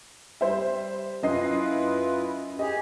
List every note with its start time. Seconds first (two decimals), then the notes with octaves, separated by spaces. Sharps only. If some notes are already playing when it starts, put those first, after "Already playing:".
0.41 G3 C5 E5
1.23 F#2 E4 F4 B4 D#5 C7
2.59 G4 G#4 D#5